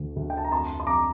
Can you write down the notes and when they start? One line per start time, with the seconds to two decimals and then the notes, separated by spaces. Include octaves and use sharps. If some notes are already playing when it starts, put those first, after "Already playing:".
Already playing: D2 D3 A3
0.16 D2
0.30 G5
0.37 A5
0.45 A#5
0.51 F2 A5 C6
0.80 C6
0.87 F2 A#5 D6